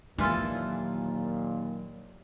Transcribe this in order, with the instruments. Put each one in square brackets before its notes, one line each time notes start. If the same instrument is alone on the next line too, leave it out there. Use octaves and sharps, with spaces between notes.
[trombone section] D#2 A#2 [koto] E3 F4 A4 [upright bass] F#3